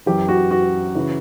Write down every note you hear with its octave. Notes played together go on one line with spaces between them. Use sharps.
F#2 E3 G4
F#4
F#4
C#3 E3